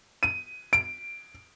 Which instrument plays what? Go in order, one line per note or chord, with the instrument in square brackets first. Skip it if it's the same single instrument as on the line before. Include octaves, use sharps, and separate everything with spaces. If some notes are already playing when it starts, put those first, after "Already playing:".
[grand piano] D#7
D7